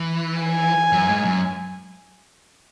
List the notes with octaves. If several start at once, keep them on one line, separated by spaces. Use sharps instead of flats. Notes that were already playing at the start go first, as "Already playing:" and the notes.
Already playing: E3
G#5
F#2
G#2
F#2